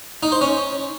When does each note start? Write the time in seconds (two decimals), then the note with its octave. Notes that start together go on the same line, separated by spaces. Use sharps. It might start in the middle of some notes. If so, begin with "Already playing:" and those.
0.23 D#4
0.32 C5
0.41 C#4